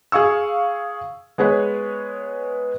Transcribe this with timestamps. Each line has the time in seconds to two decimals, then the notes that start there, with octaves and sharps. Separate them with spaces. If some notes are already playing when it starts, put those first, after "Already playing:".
0.12 G#4 F5 C#6 E6
1.38 G#3 B3 G#4 B4 C#5